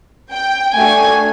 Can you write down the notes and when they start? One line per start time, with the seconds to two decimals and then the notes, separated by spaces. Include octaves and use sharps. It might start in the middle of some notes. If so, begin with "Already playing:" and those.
0.31 G5
0.77 A3 D4 F#4 A4 G#5